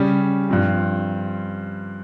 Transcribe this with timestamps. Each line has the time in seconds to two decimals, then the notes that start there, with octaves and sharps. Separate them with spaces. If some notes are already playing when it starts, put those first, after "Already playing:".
Already playing: C#3 G3 C#4
0.49 G2 F3 C4